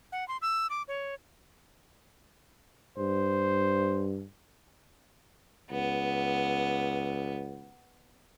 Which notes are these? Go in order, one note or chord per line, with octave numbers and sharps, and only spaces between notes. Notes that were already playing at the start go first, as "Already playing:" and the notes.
F#5
C6
E6
D6
C#5
G2 C5
C#2 B3